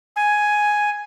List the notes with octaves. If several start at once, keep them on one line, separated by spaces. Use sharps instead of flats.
G#5